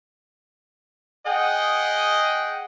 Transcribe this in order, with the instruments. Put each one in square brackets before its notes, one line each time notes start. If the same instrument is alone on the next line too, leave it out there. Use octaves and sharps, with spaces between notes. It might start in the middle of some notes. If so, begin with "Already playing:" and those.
[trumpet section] G#4 D#5 F#5 G5